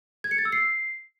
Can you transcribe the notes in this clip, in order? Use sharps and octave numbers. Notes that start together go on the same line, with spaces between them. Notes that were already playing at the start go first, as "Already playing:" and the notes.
G#6
C#7
A6
E6
C7